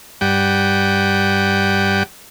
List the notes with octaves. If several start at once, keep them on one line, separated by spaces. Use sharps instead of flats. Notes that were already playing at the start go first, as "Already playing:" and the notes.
G2 G3 F#5 G5